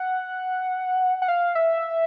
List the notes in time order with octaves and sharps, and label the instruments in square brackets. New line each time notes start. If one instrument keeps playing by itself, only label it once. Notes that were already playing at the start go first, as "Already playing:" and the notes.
Already playing: [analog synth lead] F#5
F#5
F5
E5